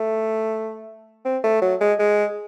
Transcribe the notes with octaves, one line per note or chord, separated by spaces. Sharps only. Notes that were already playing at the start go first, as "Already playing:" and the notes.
Already playing: A3
C4
A3
F#3
G#3
G#3